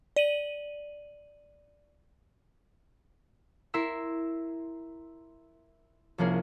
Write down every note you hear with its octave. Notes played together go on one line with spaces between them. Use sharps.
D5 D#7 F#7
E4 A#4 C6 E6 B6
C2 F3 A#3 C#4 G#4